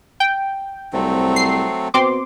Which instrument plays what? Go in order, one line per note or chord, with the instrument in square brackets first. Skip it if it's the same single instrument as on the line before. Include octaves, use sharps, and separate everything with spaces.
[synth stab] G5
[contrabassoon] C2 [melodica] F#3 A3 C4
[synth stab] C7
[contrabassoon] B2 [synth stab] C4 C6 D6